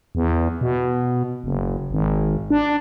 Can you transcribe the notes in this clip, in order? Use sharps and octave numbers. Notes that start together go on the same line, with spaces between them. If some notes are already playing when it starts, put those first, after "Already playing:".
E2
B2
F#1
G#1
D4